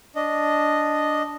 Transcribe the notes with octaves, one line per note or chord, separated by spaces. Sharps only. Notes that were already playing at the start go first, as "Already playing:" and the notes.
D4 D#5